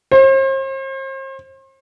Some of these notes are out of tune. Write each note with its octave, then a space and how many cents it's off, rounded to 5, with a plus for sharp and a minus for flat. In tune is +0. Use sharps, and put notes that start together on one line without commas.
C5 +40